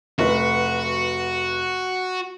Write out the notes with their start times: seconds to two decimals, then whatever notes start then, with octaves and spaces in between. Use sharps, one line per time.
0.19 F1 F#4 B4